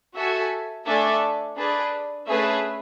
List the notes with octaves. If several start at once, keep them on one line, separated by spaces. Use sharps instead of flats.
F#4 A4 E5 G#5
A3 D4 A4 E5 G#5
D4 G#4 B4
A3 C#4 G#4 B4 E5